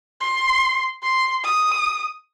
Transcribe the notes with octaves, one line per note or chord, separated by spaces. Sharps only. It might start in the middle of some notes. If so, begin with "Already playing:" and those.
C6
C6
D#6